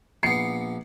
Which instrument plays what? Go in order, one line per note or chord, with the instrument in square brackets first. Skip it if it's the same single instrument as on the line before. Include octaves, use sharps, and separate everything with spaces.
[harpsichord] A#1 B3 [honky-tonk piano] C7 C#7